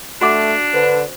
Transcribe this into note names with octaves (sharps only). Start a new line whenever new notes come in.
A3 D4 F#4 F#5 D6
D3 B4 C5